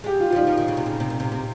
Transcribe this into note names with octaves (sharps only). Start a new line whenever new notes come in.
G#3 G4
F4
F3 F4
G3 D#4
F3
D#3
C#3
C3
C#3
C3
A#2
C3
C3